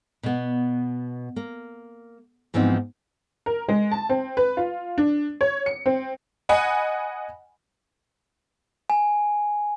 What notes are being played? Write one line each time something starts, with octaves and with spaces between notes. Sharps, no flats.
B2 B3
A#3
G#2 E3 F3 B3 C4 D#4
A#4
G#3
A5
C4
B4
F4
D4
C#5
C#7
C4
D#5 F#5 G#5 B5
G#5